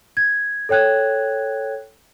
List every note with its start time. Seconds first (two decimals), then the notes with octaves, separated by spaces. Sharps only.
0.17 G#6
0.69 A4 C#5 G5 F#6 G#6